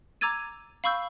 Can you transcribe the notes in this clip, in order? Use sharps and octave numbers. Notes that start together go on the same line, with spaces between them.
A#5 D6 E6 G#6 A6 D#7
F5 B5 C#6 E6 G6